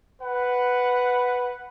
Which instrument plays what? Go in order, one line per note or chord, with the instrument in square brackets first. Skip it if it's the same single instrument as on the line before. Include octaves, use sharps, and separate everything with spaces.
[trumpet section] B4 F#5